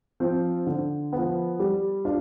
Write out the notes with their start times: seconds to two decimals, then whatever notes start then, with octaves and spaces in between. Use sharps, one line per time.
0.20 F3 C4 F4
0.67 D3
1.13 F3 B3
1.59 G3
2.05 D4 F4